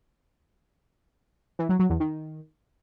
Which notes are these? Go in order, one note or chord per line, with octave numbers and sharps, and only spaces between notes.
E3
F#3
F#3
E2
D#3